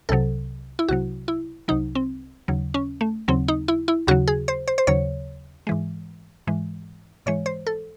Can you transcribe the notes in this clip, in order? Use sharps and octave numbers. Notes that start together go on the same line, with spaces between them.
C2 C3 F#3 A4
E4
C2 C3 F#3 F#4
E4
C2 C3 F#3 D#4
C4
D#2 C#3 F#3
C#4
A3
D#2 C#3 F#3 C4
D#4
E4
E4
D#2 C#3 F#3 F#4
G#4
C5
C5
C5
D#2 C#3 F#3 C#5
G#2 E3 G#3
G#2 E3 G#3
G#2 E3 G#3 C#5
C5
A4